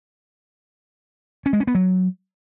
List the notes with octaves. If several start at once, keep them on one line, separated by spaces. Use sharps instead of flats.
C#4
G#3
C#4
B3
F#3